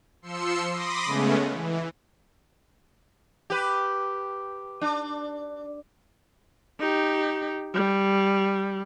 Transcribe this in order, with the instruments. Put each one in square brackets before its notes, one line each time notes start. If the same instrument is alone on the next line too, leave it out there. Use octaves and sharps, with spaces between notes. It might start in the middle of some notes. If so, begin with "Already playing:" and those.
[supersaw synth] F3 C6 E6 C#7
B5 C6 D6 D#6 A#6
C#3 G#3 A3 B3 C#4
E3
[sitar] G4 B4
D4
[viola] D#4 G4
G3